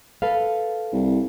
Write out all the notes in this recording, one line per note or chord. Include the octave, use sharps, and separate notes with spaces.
A4 B4 F5
C2